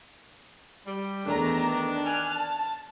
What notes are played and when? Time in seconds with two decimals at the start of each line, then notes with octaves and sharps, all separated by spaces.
0.86 G3
1.25 E2 D#3 A3 D4 A#5
2.04 G#5 F6 F#6
2.33 A5